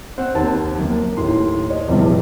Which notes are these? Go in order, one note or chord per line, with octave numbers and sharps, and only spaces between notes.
C4 C5 F#5
D#2 A5
F#2 A#3
D#2 A2 C6
C#5 D#5
F1 A#1 E2 G2